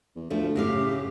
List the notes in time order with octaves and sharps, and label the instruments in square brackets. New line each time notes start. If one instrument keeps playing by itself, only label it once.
[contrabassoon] E2
[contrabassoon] D2 [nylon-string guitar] F3 A3
[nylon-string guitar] F#2 A2 F5 [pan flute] G4
[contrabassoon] C#3